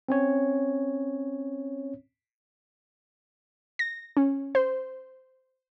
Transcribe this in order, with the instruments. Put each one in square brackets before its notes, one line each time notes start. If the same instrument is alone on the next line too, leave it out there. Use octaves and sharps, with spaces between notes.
[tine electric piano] C4 C#4 C#5
[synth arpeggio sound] A#6
C#4
C5